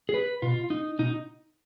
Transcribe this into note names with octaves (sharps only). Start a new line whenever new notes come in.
G#4
B4
B2 F4
D#4
B2 D#4